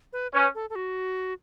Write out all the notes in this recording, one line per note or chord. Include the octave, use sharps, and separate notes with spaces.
B4
C#4 B4
A4
A4
F#4